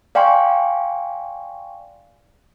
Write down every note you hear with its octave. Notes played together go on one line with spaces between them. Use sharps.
D5 F5 G5 G#5 C6 C#6